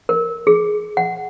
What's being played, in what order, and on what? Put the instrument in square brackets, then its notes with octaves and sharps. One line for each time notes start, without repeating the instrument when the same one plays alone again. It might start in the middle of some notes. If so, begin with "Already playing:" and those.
[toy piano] A#4
G#4
F#5